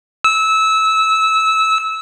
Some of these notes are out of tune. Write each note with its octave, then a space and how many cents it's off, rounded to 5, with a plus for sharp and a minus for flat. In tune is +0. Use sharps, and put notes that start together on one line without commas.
E6 -20